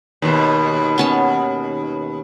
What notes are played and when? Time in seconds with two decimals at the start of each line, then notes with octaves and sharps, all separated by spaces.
0.22 D#2 B2
0.98 B3 C#4 A5